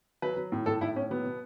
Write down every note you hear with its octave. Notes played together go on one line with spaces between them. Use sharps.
F#3 B4
F#3
A2
A2 A4
A2 E4
A2 C#4
F#3 B3
B2